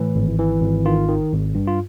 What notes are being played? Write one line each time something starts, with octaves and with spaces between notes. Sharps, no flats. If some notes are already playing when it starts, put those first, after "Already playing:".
Already playing: A2 E3
G#1
E3
G#1
D#3 F4
D#3
G#1
G2
F4